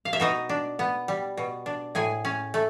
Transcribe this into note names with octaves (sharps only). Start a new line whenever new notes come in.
F5
E5
B2 D#4 D#5
D4
B3
G3
B2
D4
A2 G#4 G#5
C#4
A3